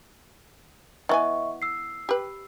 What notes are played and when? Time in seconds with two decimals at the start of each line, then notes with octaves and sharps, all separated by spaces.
1.09 E3 B3 D#5 E5 G#5 C#6
1.62 E6 C7
2.09 G4 B4